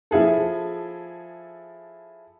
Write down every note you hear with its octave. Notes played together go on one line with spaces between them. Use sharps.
F3 E4 G#4 A4